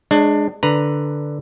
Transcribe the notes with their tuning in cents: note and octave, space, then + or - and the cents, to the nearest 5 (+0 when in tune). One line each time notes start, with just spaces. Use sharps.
G#3 +0 D4 +20 C#5 +0
D3 +0 B4 +0 A#5 +0